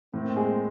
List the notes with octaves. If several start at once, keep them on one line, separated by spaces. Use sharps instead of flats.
A2 A#3 C4
G#3